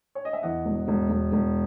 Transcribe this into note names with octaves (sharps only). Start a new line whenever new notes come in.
C#5
D#5
E5
E2 D#5 F#5
E1
E1
E1
E1